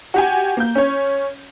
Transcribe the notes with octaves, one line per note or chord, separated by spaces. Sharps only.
F#4 G4 G#5
A#3 G6
C#4 C#5